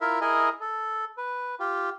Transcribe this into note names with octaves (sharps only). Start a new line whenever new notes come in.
E4 F4 A#4 E5
E4 G#4 A#4 D#5 G#5
A4
B4
F4 G4